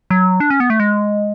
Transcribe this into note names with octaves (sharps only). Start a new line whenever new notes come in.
F#3
D4
C#4
B3
A3
G#3